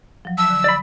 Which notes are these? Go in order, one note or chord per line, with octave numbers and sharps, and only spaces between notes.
F3 F#3
A5 E6
D3
D5 B5